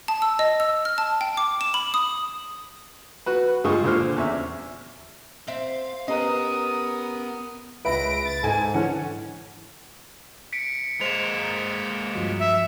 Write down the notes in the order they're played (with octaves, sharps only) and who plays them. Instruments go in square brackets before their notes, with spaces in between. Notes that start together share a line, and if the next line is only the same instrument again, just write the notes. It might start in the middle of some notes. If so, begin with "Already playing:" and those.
[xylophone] A5
E6
D#5
E6
F6
A5
G5
D6
E7
B5
D#6
[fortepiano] F#4 B4
G2 G#3 F4 C#6 D#6
A#2 D3 C5 F6
E2 C#4 E5
[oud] C4 E5 [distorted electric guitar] F5
[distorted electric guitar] B3 [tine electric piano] C#4 G4 A#5 [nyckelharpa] A#4 D#6 [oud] B4 D#5
[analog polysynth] C#2 A#6 D7 [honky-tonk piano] B4 E5 B5
[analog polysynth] A6
[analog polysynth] G#2 [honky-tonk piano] A4 G#5
[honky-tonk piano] D3 E3 F#5 [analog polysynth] C#4
[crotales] B6 C#7 D7
[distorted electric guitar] G#3 A#3 [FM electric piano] C5 [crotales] E7 F7
[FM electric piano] G2 F3 F#3
[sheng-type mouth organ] E5